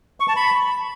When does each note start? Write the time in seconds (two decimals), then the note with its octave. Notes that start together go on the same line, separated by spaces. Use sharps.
0.20 C#6
0.28 A5
0.36 B5